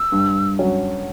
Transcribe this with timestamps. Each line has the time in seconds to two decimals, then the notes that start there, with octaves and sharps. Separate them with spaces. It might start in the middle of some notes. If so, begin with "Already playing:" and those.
Already playing: E6
0.12 G2
0.59 F#3 C#4